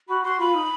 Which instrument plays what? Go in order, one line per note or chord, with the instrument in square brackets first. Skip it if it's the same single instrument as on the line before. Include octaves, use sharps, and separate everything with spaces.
[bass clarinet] F#4 [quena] B5
[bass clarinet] F#4 [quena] C6
[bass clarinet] F4 [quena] B5
[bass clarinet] D#4